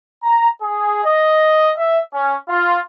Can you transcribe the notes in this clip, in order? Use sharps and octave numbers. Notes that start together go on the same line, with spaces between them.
A#5
G#4
D#5
E5
C#4
F4